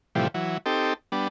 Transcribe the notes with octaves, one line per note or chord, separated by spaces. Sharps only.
A2 C3 E3 F3 G3
E3 F#3
C4 D#4 G4 A4
G3 B3 D4